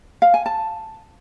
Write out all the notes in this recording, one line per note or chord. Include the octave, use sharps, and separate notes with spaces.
F5
G#5
A5